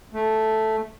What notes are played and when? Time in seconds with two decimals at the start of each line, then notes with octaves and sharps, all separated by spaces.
0.14 A3